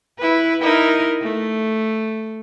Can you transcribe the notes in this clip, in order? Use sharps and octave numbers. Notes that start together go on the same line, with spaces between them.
E4 B4
D#4 E4 A#4
A3